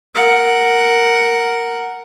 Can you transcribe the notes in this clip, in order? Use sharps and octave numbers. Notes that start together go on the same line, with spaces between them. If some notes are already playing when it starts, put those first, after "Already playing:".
A#4 F#5